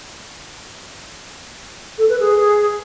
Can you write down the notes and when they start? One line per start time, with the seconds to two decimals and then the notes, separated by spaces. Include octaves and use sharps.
1.98 A4
2.09 B4
2.20 G#4